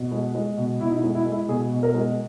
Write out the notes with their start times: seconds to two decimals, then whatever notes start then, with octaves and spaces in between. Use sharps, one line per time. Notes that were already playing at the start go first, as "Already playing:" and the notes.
Already playing: B2
0.12 G#3
0.35 G#3
0.57 B2
0.80 B2 E4
0.89 D#4
0.97 E4
1.04 G#3
1.15 E4
1.27 G#3
1.32 E4
1.48 B2 G#4
1.72 B2
1.83 A#4
1.94 G#3